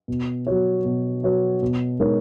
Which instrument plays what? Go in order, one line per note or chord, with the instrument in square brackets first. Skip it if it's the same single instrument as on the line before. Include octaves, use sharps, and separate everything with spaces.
[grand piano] B2
F#3 B3 F#4 C#5
B2
F#3 B3 F#4 C#5
B2
G#3 D#4 A#4 C#5